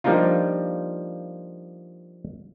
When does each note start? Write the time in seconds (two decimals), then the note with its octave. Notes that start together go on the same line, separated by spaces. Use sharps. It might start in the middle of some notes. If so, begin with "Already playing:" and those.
0.04 F3 G3 A#3 D4 D#4 F4